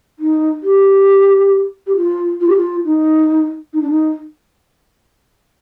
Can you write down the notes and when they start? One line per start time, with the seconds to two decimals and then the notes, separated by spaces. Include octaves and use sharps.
0.19 D#4
0.63 G4
1.87 G4
1.97 F4
2.41 F4
2.49 G4
2.56 F4
2.85 D#4
3.73 D#4
3.82 D4
3.90 D#4